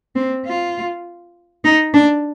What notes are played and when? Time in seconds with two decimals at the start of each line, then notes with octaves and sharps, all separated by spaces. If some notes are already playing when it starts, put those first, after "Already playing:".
0.16 C4
0.46 F4
1.64 D#4
1.94 D4